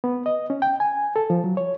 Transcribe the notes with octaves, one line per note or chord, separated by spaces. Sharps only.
B3
D#5
C#4
G5
G#5
A4
F3
F#3
C#5